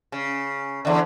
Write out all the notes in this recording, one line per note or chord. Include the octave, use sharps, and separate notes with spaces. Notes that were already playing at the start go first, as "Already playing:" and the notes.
C#3
E2 D3